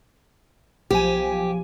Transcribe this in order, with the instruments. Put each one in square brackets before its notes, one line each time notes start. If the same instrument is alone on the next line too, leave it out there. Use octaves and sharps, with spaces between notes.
[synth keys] B1 F3 G#5 [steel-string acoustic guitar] G4